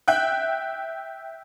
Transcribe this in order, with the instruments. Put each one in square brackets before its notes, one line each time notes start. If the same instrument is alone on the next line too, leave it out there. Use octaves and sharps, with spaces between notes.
[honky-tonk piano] E5 G5 F#6